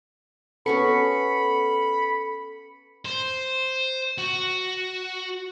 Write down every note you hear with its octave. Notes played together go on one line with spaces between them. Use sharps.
B3 C#4 F#4 A4 B5 C#7
C5
F#4